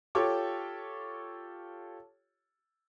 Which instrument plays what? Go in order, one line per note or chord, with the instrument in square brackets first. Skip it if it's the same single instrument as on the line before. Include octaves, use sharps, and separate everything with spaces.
[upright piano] F4 G4 A4 C#5 D6